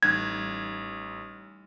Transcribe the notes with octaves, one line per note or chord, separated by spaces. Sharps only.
A1 G3 D#4 F#6 G#6